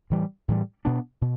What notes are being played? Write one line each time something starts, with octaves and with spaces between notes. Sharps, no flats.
A2 E3 G3
A2 E3 G3
B2 B3 D4
B2